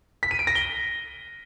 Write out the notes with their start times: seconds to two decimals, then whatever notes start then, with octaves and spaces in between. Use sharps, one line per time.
0.23 B6
0.31 D#7
0.39 D7
0.47 A#6
0.55 G7